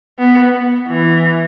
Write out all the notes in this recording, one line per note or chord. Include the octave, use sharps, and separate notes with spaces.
B3
E3